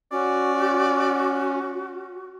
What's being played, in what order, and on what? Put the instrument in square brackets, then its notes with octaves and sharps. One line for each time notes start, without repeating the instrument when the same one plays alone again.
[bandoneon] C#4 [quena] F#4 [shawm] D5